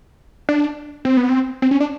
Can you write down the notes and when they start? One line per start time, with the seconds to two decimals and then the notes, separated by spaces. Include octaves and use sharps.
0.49 D4
1.05 C4
1.17 B3
1.29 C4
1.62 C4
1.71 C#4
1.80 D4